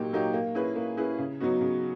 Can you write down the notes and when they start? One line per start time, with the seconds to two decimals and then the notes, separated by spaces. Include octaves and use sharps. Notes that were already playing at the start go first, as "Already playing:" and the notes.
Already playing: A#2 F#3 A#3 D#4 G4
0.13 F#3 A#3 D#4 G4
0.34 A#3
0.55 C#4 E4 G#4 B4
0.76 A#3
0.97 C#4 E4 G#4 B4
1.19 C#3
1.40 F#3 B3 D#4 F#4
1.61 C#3